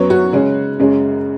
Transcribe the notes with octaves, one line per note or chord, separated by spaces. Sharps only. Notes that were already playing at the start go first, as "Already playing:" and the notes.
Already playing: F#2 F#3 B3 C#5
F#4
C#3 G#3 C#4
F#2 C#3 G#3 C#4